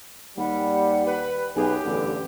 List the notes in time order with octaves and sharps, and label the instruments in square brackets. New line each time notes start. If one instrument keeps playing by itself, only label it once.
[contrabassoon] D#2 [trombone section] G3 [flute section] F#5 B5
[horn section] B4
[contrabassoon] B1 [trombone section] F#2 G#4 [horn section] G4 [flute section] B4 G#5
[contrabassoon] A1 [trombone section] E2 G2 D3 [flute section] A4